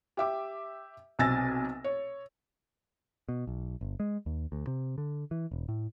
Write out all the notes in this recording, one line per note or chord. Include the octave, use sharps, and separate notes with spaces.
G4 E5 D6
B1 C3 G#5 E6 A6 A#6
C#5
B2
B1
G1
G#3
D#2
D2
C3
D3
E3
E1
A2